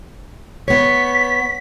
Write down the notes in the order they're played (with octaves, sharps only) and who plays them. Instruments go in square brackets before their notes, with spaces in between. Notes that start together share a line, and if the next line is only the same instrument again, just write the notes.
[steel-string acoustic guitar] B3 C#5 [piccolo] B6